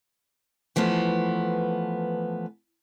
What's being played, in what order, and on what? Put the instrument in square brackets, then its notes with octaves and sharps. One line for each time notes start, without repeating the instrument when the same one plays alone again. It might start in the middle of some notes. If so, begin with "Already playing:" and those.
[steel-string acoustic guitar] E3 F3 A3 B3